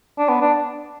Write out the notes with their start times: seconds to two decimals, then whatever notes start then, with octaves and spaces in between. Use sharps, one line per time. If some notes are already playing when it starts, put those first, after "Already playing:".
0.18 D4
0.29 B3
0.41 D4